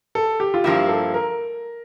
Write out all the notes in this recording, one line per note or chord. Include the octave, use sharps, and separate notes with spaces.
A4
G4
F4
G2 F3 A#3 E4 G4
A4
A#4